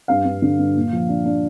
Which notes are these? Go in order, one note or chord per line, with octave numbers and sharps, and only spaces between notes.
G2 F5
G2
D3
G2
A#2
F3
D4
D4